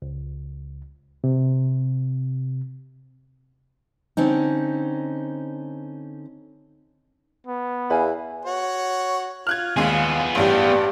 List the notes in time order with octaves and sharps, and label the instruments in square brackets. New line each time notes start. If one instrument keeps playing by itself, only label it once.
[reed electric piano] C#2
C3
[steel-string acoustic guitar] D3 C4 C#4 D#4
[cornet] B3
[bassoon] E2 [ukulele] F5 G#5 B5
[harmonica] F#4 C#5
[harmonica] F4 [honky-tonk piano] F6 F#6 G#6
[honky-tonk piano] D#2 G#3 F5 [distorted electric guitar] B3 G#4
[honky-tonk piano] A1 G2 [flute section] G4 C5 D5